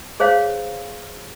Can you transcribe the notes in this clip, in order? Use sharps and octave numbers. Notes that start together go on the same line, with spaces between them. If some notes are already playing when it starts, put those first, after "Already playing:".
G#4 C5 C#5 F5